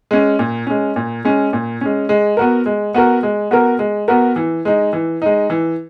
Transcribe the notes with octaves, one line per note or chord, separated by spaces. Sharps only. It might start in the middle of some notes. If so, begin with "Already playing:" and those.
G#3 C#4
A#2
G#3 C#4
A#2
G#3 C#4
A#2
G#3 C#4
G#3
B3 F#4 A#4
G#3
B3 F#4 A#4
G#3
B3 F#4 A#4
G#3
B3 F#4 A#4
E3
G#3 D#4
E3
G#3 D#4
E3